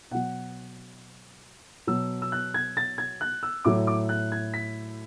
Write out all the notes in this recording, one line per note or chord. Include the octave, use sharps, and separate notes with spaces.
B2 F#3 F#5
B2 F#3 E6
E6
F#6
G#6
A6
G#6
F#6
E6
A2 F#3 D6
D6
F#6
G#6
B6